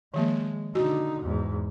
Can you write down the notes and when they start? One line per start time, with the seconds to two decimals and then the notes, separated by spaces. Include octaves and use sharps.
0.14 D#3 F3 G#3 A#3
0.75 D3 D#4 F#4
1.22 E2 G#2